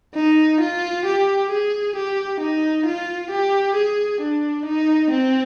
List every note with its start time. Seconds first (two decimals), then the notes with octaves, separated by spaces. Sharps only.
0.15 D#4
0.60 F4
1.05 G4
1.50 G#4
1.95 G4
2.40 D#4
2.86 F4
3.30 G4
3.75 G#4
4.21 D4
4.65 D#4
5.10 C4